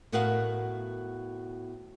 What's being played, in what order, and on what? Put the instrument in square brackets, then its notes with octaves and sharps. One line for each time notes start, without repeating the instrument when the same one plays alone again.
[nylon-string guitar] A2 B3 F#4 A#4 F5 F#5